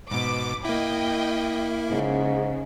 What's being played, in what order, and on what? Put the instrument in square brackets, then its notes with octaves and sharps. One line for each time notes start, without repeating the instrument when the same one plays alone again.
[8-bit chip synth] G#2 B2 [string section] B4 D6
[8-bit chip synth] A#3 E4 [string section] D#5 G5
[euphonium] G#2 [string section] C#3